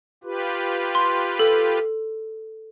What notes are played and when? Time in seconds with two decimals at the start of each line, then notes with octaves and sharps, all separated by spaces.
0.24 F4 G4 B4
0.95 C6
1.39 A4